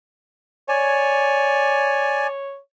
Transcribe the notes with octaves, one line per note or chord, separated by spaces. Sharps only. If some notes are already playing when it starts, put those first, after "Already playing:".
C#5 D5 G#5